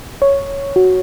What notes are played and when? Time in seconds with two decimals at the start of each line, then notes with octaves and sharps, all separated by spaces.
0.22 C#5
0.76 F#4